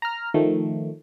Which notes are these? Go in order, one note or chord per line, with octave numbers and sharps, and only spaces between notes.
A#5 F6
D#3 F3 A3